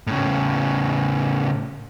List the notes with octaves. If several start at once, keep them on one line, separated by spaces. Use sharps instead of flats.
A2 C#3